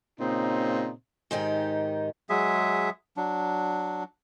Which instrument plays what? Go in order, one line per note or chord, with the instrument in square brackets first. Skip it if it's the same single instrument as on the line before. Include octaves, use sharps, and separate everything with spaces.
[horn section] A#2 C#3 C4 D#4
[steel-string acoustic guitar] G#2 D#3 D#4 G4
[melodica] F#3 G#3 G#4 E5
F#3 D4